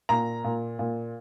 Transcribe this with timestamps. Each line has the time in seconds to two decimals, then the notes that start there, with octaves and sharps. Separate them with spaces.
0.09 A#2 A#5
0.44 A#2
0.79 A#2